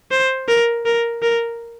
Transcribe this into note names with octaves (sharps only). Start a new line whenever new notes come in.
C5
A#4
A#4
A#4